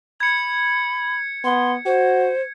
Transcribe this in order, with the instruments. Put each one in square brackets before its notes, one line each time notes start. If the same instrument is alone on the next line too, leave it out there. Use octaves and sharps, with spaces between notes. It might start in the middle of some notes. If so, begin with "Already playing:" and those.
[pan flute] B5 [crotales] G#6 C#7
[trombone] B3 [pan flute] C6
[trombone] F#4 [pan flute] C5